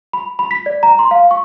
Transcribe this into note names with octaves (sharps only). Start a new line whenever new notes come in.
B5
B5
B6
D5
A#5
C6
F5
C#6